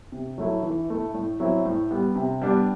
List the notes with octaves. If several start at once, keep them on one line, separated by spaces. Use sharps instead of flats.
C3
F#3 A3 E4
E3
A3 E4
A2
F#3 C4 E4
A2
G3 B3
C3
G3 B3 D4